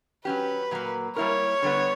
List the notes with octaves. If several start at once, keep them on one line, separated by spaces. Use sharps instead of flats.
F#3 C#4 G4 B4
A#2 F#3 A#3
G3 A#3 E4 A#4 C#5
D3 G3 B3